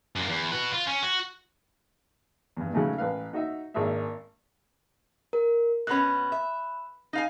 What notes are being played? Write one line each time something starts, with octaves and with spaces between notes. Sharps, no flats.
F#2 A#3
E2
F#4 B4
F4
C#4
F#4
E2 G2
C#3 F#3 G#3 A3 D#4
A1 B4 F5
D#4 F#4 D#5 E5
G#1 A#3 D4 G#4 E5
A#4
B2 B3 C#4 B5 F#6
E5
D#4 F5 G#5